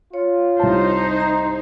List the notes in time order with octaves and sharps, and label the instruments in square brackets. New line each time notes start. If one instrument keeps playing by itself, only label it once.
[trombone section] F4 [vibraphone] C#5
[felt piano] C2 A5 [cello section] D#4 C5
[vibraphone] A#5